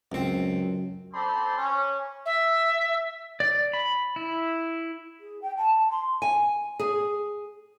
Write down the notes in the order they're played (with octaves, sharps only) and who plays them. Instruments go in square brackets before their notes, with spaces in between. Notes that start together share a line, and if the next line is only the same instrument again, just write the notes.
[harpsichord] C#2 C4 [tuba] F#2
[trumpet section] C4 A4 C5 D5 B5 C6
C#4
[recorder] E5
[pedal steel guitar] D5
B5
E4
[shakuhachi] G#4
G5
A5
C6
[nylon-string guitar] G#5
G#4